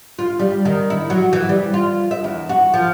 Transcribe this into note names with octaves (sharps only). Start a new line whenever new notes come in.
F4
G3
D#3
E4
F#3
E3
G3
F4
E5
E2
F#4
F3